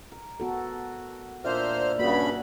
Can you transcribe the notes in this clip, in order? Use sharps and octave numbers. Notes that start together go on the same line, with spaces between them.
A#4
B3 F#4 A4
A#2 A#3 D4 C5 E5 A#5 F6
G2 C#3 A#3 F#4 B4 B5